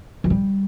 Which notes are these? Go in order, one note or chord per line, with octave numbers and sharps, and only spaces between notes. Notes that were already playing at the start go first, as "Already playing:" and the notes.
E3
G3